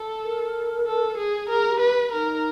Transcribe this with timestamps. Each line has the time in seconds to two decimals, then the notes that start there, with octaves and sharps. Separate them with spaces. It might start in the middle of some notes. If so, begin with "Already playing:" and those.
Already playing: A4
0.24 A#4
0.86 A4
1.18 G#4
1.49 G#4 A#4
1.70 G4
1.80 B4
2.12 D#4 A#4